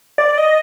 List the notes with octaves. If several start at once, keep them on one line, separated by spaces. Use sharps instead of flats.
D5
D#5